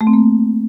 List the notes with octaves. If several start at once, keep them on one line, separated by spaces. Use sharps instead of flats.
A3
C4
A#3